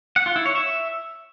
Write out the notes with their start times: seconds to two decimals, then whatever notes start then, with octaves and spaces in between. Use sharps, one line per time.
0.16 F#5
0.26 F4
0.36 E4
0.46 C#5
0.55 E5